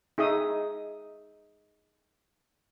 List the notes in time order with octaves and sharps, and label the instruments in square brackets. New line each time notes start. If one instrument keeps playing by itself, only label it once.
[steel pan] D#4 G#4 E5 D#6